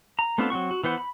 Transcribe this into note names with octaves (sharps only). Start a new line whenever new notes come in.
A#5
A3 B3 C4 D4 F4
F#3 C4 F#5 C#6
F#4
E3 B3 C5 F#5
B5